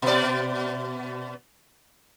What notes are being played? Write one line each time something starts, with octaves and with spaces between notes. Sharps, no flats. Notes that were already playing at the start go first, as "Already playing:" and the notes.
B2 D5